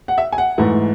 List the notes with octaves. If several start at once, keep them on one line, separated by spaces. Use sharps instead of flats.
F#5
E5
G#5
F#5
G#2 E3 A3